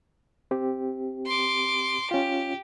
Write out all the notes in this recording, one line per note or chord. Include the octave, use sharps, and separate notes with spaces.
C4 G4
C6 D6
C#4 F4 G4